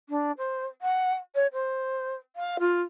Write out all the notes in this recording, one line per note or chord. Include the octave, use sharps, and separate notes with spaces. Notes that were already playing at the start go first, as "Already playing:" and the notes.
D4
C5
F#5
C#5
C5
F5
F4